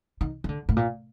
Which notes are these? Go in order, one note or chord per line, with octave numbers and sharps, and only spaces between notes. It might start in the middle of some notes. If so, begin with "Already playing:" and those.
D#3
D#3
D3
A2
A#2